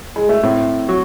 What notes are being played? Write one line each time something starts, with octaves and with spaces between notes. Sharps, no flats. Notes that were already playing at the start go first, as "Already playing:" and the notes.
G#3
A3
A2 C4
F#3